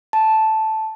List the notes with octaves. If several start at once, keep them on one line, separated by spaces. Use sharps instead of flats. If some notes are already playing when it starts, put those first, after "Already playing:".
A5